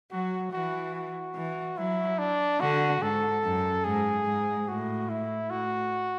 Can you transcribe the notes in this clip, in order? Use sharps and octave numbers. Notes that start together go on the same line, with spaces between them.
F#3 F#4
E3 F#4
F#4
E3
F#3 E4
D4
D3 F#4
G#2 A4
F#2
G#2 G#4
G#2
A2 F#4
E4
A2 F#4